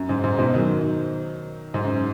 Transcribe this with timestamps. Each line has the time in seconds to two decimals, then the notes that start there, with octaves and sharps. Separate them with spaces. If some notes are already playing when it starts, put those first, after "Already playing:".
Already playing: F#2
0.09 G#2
0.24 G#2
0.38 G#2 B2
0.54 D#3 F#3
1.74 G#2
1.85 F#2